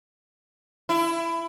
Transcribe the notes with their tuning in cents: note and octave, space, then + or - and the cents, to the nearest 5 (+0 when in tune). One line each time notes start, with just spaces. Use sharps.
E4 +20